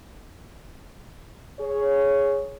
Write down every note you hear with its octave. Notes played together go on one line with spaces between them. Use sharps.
G#4 C#5